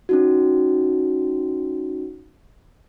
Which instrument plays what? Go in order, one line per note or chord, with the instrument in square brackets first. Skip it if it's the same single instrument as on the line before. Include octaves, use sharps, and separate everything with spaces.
[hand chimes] C#4 D#4 F#4